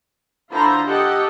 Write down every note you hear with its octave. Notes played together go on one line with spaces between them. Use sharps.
D3 E4 F4 C5 A#5
G4 A4 D#5 F#5 G5